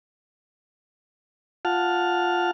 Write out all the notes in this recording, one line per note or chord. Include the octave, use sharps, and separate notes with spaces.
F4 F#5 A5 F6